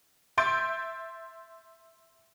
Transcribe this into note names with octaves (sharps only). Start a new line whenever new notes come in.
E5 C6 G6 A6 D7